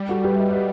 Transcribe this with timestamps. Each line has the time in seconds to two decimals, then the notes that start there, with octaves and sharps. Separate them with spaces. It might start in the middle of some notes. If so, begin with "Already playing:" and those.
Already playing: G3
0.09 F#4 A4
0.24 G4 B4
0.35 E5
0.39 B4 D#5
0.51 B4 D#5